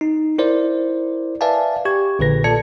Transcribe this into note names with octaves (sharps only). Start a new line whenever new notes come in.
D#4
E4 A#4 C5 D5
B4 D5 E5 F5 G#5 A5
G4 C#6 G#6
A#1 A#2 D3 B4 A#6
A#2 A4 D5 A5 G#6 C#7